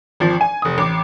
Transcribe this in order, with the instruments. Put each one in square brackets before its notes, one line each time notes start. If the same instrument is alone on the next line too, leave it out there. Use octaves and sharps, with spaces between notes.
[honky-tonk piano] G#1 F3
G#5
F1 D#6
A1 D6